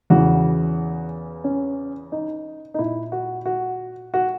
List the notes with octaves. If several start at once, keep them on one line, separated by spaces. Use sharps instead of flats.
E2 C#3 E3 F#4
C#4
D#4
D#4
A#2 E4
F#4
F#4
F#4